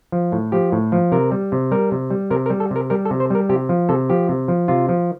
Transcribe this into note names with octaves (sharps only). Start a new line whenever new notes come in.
F3
A2
F3 G4
A2
F3
C3 A#4
G3
C3
G3 A#4
C3
G3
C3 A#4
A#4
G3
A4
C3
A#4
G3 A#4
A4
C3
C5
G3 A#4
C3 G4
F3
C3 A4
F3 G4
C3
F3
C3 F4
F3